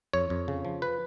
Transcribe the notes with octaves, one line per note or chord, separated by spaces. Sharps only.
F2 C#5
F2
C#3
F3
B4